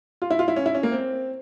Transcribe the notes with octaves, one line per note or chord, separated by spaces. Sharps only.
F4
E4
F4
E4
C#4
E4
C#4
A#3
C4